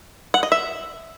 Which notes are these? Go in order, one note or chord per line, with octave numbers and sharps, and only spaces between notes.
F#5
D#5
E5